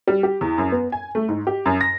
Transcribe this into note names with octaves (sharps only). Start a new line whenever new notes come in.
G3
G4
E2
F#2
B3
G#5
A3
G#2
G4
F#2
A#6